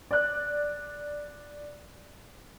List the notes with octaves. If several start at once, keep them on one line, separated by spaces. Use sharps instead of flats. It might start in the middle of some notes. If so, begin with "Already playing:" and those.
D5 F#6